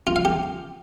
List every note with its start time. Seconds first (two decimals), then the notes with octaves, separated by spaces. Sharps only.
0.07 F4
0.16 F5
0.25 G4